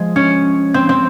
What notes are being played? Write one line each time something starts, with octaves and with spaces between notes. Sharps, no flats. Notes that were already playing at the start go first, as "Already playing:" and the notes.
Already playing: F3 G#3
C#4
C4
C4